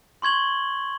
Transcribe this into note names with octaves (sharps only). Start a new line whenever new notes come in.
C6 C#6 G#6 F#7 G7